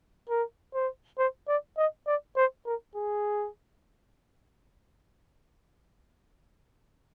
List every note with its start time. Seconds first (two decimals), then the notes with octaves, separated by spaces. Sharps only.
0.30 A#4
0.74 C5
1.18 C5
1.48 D5
1.78 D#5
2.07 D5
2.37 C5
2.66 A#4
2.95 G#4